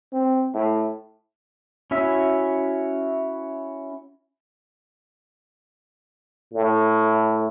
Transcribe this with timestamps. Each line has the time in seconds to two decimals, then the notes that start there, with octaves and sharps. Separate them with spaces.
0.13 C4
0.54 A2
1.91 C#4 E4 F#4 E5
6.54 A2